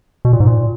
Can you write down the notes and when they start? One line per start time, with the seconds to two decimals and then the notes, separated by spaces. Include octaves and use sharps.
0.25 B2
0.33 A#2
0.40 G#2
0.47 A#2